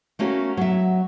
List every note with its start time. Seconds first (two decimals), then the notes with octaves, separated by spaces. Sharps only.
0.19 A3 A#3 C#4 F#4
0.57 F#3 E5